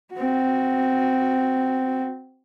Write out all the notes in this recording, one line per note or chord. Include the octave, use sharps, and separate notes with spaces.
C4 F#4